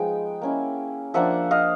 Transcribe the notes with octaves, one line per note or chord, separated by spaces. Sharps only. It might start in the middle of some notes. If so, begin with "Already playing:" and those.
Already playing: F3 G#3 B3 D#4 G5
A#3 C#4 E4
F3 A#3 D4 E5 F#5
D#5 F5